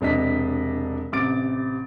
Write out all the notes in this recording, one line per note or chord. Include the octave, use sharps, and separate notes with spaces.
E1 C3 D4 D#5 B6
A1 C3 D6 A6 D7